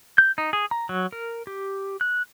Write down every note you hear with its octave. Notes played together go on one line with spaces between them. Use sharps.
G6
D#4
G#4
A#5
F#3
A#4
G4
F#6